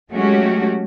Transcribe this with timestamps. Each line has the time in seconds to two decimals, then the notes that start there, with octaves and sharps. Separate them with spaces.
0.12 F#3 G#3 A3 C#4 F#4 G4